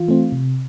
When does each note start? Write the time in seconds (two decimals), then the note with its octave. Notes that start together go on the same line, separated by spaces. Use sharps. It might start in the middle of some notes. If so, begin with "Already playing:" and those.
Already playing: E3 F4
0.08 A3 C4
0.32 C3